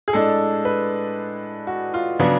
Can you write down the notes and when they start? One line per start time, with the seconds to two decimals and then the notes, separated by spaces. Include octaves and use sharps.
0.08 G#4
0.13 A2 G#3 D4 A4
0.65 B4
1.67 F#4
1.94 F4
2.19 C#3 F#3 B3 D4